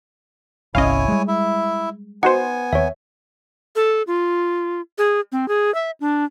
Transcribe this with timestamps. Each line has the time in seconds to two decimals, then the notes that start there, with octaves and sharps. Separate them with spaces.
0.75 G1 C2 C#4 E4 C#5 D#5 F5 G#5
1.08 G3 G#3
1.28 E4 E5
2.23 B3 D#4 F#4 C5 F#5 G#5
2.73 D#2 C#5 E5
3.76 A4
4.07 F4
4.98 G#4
5.32 C4
5.48 G#4
5.75 E5
6.00 D4